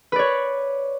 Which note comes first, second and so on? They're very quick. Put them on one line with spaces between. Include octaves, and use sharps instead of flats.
B4 D5 C#5